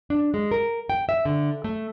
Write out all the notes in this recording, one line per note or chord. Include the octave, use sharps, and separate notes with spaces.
D4
G#3
A#4
G5
E5
D3
A3